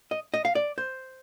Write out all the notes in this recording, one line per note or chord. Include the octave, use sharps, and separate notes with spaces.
D#5
D#5
F5
D5
C5